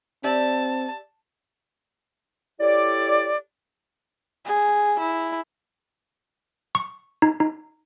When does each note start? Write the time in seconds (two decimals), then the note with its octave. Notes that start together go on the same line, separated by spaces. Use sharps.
0.24 C4 G4 D5 E5 A5
2.60 E4 G4 A4 C#5 D5
4.46 G#4
4.99 E4
6.75 C#6
7.22 D#4
7.40 D#4